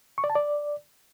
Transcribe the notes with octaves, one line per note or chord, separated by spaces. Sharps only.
C#6
D5
A5
D5